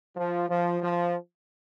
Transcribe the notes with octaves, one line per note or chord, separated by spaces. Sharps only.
F3
F3
F3